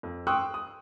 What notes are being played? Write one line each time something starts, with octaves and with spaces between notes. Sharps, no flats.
F2
G5 C6 C#6 D#6 E6 F#6
D#6